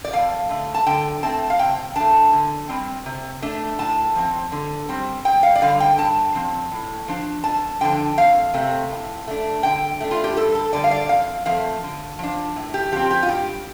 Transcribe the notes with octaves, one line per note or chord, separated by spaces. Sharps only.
D5
F2 F5
D3 A3
A5
D3 G5
A3 C4 A5
F5
C3 G5
A3 D4 A5
D3
G3 C4
C3
A3 D4
A2 A5
F3 C4
D3
G3 C4
G2 G5
F5
D5
D3 G3 F5
G5
G2 A5
F3 C4
A2
F3 D4
F2 A5
D3 F3 D4 G5
F2 F5
C3 A3 C4
A2
A3 D4
D3 G5
A3 D4
F4
G4
G2 A4
A4
D3 G3 D5
F5
D5
F2 F5
F3 A3 C4 F5
D3
F3 D4
A2
G4
F3 C4 G4
G4
F4
G2 G4